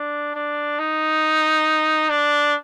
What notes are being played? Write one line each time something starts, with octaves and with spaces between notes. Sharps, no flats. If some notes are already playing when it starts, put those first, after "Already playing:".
Already playing: D4
D4
D#4
D4